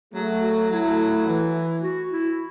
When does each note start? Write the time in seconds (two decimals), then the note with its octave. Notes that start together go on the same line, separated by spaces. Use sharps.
0.13 F#3 A3 G#4
0.42 F#4
0.70 F#3 A3 E4
1.27 E3
1.83 F#4
2.11 E4